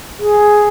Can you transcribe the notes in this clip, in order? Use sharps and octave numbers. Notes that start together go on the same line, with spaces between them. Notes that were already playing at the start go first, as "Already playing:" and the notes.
G#4